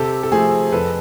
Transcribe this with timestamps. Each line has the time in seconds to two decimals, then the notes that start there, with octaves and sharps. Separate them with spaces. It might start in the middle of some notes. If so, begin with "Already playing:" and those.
Already playing: C3 G4 A4
0.23 A4
0.32 F3 A3 C4 G#4
0.72 F2 A4 B4